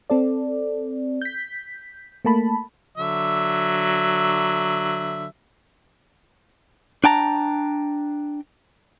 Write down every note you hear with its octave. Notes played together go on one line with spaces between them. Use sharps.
C4 A4 D5
G6 B6
A3 A#3 A5 B5
D3 F#3 E5
D4 G5 A5 A#5